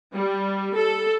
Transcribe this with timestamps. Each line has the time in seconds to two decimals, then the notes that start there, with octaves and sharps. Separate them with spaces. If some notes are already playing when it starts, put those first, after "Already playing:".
0.13 G3
0.74 A4